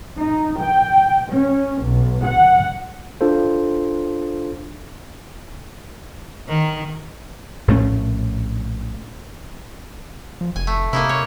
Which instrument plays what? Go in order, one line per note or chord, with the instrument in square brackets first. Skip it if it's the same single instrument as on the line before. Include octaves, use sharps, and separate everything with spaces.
[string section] D#4
G5
C#4
B1
F#5
[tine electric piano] D4 F4 A4 C5
[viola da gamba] D#3
[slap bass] A#1 A2 A3 C#4
[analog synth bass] F3
[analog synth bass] F1 [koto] G#5
[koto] A3
[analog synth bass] C3 [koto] A#3 D#4 E4
[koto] C#5